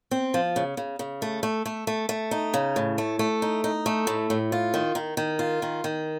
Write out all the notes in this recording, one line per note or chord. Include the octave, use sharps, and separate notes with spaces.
C4
F3
C#3
C#3
C#3
A3
A3
A3
A3
A3
D#4
C#3
A2
A3
A3
D#4
D#4
A3
A2
A2
F4
D#3
D#3
D#3
F4
D#3
D#3